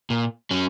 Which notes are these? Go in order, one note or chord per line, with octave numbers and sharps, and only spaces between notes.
A#2
F#3 C#4